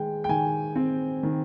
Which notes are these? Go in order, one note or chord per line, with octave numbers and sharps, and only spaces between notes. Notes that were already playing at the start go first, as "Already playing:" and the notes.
Already playing: D#3 G#3 G5
G5
D#3 G#5
C4
D#3